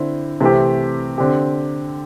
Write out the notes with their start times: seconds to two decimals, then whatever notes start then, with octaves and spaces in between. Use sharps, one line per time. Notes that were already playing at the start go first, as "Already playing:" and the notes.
Already playing: D3 C4 E4
0.41 C3 E3 A3 C4 G4
1.18 D3 C4 G4